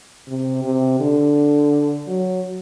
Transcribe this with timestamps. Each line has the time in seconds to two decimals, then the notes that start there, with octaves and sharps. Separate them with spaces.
0.28 C3
0.64 C3
1.00 D3
2.08 F#3